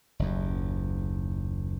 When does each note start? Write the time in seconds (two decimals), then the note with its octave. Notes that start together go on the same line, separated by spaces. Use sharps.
0.19 F#1 D#2